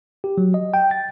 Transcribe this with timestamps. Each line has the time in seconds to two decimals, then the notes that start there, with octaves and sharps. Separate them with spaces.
0.24 G4
0.38 F#3
0.54 D#5
0.74 G5
0.91 A6